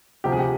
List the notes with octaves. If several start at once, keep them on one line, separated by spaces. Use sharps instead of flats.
D2 C3 F3 G4
G#4
G4